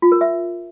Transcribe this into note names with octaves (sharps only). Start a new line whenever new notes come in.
F4
A#4
E5